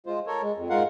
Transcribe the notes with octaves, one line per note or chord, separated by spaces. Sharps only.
G#3 F4 C5
A4 A#4 C#5
G#3
F2
G#2 G#3 F4 A#4 F5 F#5